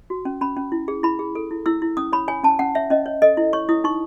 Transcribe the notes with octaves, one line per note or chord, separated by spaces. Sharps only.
F#4
C#4
C#4 B5
C#4
E4
G#4
E4 B5
G#4
A4
E4
E4 E6
E4
C#4 D#6
C#5 B5
C#5 G#5
C#4 A5
C#4 F#5
C#5 E5
C#4 D#5
C#5
A4 D#5
E4
C#5 C#6
E4 D#6
D#4 C#6